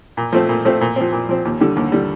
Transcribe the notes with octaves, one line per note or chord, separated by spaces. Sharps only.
A#2
F3 A3 C4
A#2
F3 A3 C4
A#2
F3 C4
A#2
F3 C4
D#2
D3 G3
D#2
D3 G3